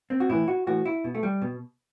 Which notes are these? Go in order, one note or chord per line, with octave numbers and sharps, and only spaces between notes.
C4
F#4
A2 E3 E4
F#4
A2 E3 F#4
E4
B2
A3
G3
B2